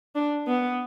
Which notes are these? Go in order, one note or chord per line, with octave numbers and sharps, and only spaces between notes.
D4
B3